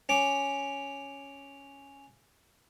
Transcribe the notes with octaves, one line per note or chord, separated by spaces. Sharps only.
C#4 D6